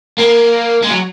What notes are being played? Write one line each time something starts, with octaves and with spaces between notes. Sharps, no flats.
A#3
G#3
F#3